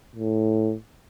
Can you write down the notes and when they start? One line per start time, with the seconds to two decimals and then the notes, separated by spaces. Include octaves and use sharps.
0.16 A2